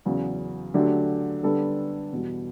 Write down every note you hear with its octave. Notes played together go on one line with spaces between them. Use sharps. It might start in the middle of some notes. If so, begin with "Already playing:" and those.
E2 C#3 F#3
D3 F#3 A3 D4 G4
D3 G3 B3 D4 A4
E2 B2 G3